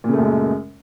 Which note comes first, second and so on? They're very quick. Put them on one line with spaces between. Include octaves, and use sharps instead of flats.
A#2 C#3 A3 F#2 G#3